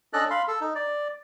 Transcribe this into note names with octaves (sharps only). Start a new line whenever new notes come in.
C#4 D4 A4 D5 D#5 F#6
F5 B5 C6
A4
D#4
D5